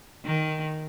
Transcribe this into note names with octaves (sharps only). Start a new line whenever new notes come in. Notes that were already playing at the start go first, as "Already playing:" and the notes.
D#3